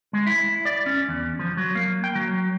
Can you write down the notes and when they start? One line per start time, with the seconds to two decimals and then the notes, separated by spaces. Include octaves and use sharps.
0.13 G#3
0.27 E4
0.65 D5
0.86 C#4
1.08 E2
1.39 F3
1.57 F#3
1.75 A#3
2.04 G5
2.15 F#3